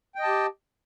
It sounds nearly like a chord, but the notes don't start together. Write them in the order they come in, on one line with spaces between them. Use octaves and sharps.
G5 D#5 A5 G4